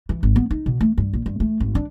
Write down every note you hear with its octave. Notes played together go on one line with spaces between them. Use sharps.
E3
G#1
B3
D#4
B2
A3
G2
A#1
G2
A3
G#1
D4